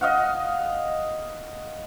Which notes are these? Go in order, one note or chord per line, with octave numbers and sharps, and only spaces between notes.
D#5 F5 F#5